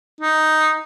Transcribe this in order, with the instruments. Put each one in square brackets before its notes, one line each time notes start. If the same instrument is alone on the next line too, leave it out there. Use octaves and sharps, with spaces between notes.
[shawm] D#4